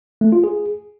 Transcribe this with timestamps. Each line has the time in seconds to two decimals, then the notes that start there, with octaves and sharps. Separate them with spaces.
0.21 A3
0.32 F4
0.44 G#4